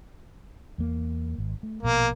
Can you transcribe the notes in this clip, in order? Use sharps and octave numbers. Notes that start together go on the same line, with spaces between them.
E2 A#3
G#1
A3
A#1 B2 A#3